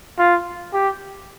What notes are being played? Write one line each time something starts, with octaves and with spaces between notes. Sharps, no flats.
F4
G4